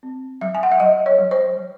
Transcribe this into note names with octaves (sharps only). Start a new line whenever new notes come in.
C4
F#3 E5
G#5
F#5
E5
F#3 D#5
C#5
F#3
C5
F#3